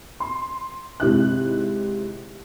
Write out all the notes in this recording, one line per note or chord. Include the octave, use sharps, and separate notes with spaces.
C6
G#2 C3 E4 F#6